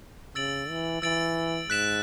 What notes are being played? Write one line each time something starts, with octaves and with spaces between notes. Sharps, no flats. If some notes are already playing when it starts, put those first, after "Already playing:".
C#3 E6 A6 D7 F#7
E3
E3 E6 A6 D7 F#7
G#2 F#6 B6 E7